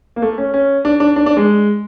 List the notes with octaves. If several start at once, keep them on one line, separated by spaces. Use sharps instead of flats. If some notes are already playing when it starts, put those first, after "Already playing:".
A#3
A3
C#4
C#4
D4
D4
D4
D4
G#3